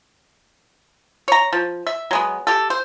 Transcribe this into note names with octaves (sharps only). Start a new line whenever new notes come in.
C#5 A#5
F3
E5
F#3 G#3 B3
G4 A4
C5